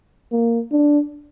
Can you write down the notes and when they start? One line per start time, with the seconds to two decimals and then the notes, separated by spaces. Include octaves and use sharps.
0.32 A#3
0.71 D4